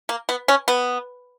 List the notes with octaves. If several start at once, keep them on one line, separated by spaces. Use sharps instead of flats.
A#3
B3
C#4
B3